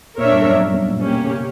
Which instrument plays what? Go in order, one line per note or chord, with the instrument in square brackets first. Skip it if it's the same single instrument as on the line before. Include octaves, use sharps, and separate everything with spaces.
[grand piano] A#2 [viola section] D4 A#4 C#5 E5
[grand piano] G2
F#2
G2
G2
A#2
[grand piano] B2 [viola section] A#3 C#4 G4
[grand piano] C#3